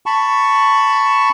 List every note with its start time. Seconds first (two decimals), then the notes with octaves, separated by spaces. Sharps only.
0.06 A5 B5 C#6